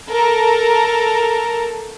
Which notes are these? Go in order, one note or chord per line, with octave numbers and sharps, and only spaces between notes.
A4 A#4